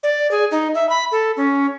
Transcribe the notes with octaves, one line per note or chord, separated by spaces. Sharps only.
D5
G#4
D#4
E5
B5
A4
C#4